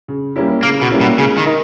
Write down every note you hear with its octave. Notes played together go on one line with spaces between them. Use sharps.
C#3
G3 A#3 C#4 E4
C#3 A#3
B2
G3 A#3 C#4 E4
B2
C#3 G#3
D#3
D#4 A#4 D#5